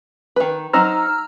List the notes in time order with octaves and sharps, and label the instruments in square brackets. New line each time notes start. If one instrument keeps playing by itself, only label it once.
[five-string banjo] D#3 B4
[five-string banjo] F#3 D#4 C5 [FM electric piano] A#5 E6 F6